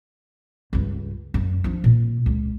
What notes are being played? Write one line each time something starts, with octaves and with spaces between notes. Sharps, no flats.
C#2 G2
F#2
F3 D4
A#2
C#2